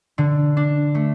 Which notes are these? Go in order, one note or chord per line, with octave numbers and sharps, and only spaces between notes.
D3
D4
A3